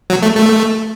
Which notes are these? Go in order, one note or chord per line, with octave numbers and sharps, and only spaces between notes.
F#3
A3
A3